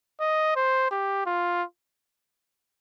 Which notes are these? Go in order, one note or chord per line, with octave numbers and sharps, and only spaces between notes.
D#5
C5
G4
F4